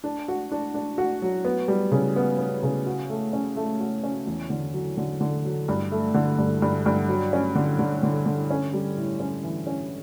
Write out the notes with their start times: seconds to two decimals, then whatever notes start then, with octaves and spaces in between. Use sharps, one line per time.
0.04 D4
0.28 F#4
0.52 D4
0.74 D4
0.98 F#4
1.22 F#3
1.45 B3
1.68 G3
1.92 C#3
2.16 B3
2.39 B3
2.63 C#3
2.86 F#4
3.10 A3
3.33 C#4
3.56 A3
3.80 F#4
4.04 C#4
4.27 E2
4.50 D3
4.74 F#3
4.97 D3
5.21 D3
5.45 F#3
5.68 G2
5.92 A3
6.14 D3
6.38 G2
6.62 G2
6.86 G2
7.08 F#3
7.33 C#4
7.55 D3
7.79 D3
8.03 D3
8.26 D3
8.50 C#4
8.73 G3
8.97 A2
9.20 C#4
9.44 E3
9.67 C#4